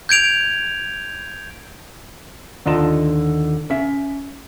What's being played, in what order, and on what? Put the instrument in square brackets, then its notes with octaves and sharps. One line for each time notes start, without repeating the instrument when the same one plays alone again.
[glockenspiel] G6 G#6 D7 F7
[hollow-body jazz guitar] D#2 D3 F4 D#5 A5
C#4 E5